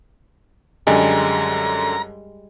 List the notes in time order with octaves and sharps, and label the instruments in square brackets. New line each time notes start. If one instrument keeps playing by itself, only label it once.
[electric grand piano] F#2 D3 [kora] G3 G#3 [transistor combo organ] A#5